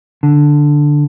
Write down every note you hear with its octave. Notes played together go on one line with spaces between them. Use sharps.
D3